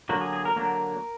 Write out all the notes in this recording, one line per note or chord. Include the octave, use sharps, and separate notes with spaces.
D3 F#3 A#3 F#4
G#4
G#4
A#4
D3 F#3 A#3 A#4